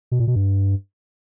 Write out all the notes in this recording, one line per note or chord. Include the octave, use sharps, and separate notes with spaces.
B2
A#2
B2
G2